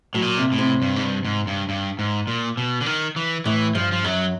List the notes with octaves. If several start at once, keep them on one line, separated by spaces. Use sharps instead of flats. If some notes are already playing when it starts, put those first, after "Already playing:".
A2 F#3
A#2
C3
A2
C3
G2
G#2
G2
G#2
G2
G2
G#2
A#2
B2
D3
D#3
E3
A2 E3
G2 F3
F3
F#2 F#3